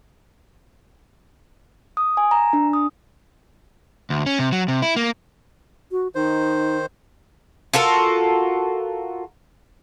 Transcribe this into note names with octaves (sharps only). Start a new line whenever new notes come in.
D#6
G#5
A#5
D4
D#6
D2
C#4
C3
F#3
C3
E4
A#3
F#4
D#3 D#4 C5
F4 F#4 A4 A#4